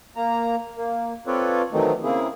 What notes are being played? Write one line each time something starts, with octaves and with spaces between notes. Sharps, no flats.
A#3 A#5
A#3
C4 F4 A4 B4 C#5 D5
D#3 E3 F#3 A3 C4 D#4
C#3 A#3 C4 E4 G#4